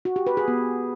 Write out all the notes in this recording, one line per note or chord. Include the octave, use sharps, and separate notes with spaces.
F#4
G4
B4
G#4
B3